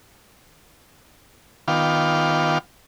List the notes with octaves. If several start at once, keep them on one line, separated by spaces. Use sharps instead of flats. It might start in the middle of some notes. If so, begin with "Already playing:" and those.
D#3 B3 F4 F5 G5 D6